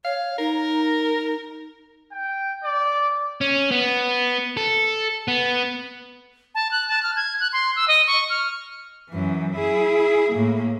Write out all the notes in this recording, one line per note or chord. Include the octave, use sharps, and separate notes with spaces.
C#5 F5
D#4 A#4
G5
D5
C#4
B3
A4
B3
A5
F#6
A5
F6
G#6
F#6
C6
E6
D#5
C#6
F6
F#2 E3
E4 G#4
A2 A#3